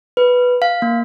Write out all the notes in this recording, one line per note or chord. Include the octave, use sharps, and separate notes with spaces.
B4
F5
A#3